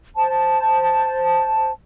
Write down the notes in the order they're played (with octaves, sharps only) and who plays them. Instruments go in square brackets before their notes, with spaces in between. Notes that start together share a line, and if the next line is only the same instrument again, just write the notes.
[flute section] C5 A5